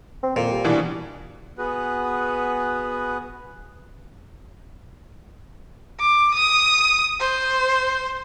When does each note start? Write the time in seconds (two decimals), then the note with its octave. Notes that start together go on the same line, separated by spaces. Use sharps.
0.23 C4
0.36 F2 A#2
0.52 G3
0.64 B2 E3 D4
1.58 B3 F#4 G#4 B4
6.00 D6
6.34 D#6
7.20 C5